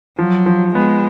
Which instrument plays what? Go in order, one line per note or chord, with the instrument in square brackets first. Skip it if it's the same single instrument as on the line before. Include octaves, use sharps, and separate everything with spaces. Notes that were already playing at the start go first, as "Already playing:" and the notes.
[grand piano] F3 [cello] F#3
[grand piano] F3
[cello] G#3 [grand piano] B3